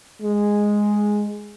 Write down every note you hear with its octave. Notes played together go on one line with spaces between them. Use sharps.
G#3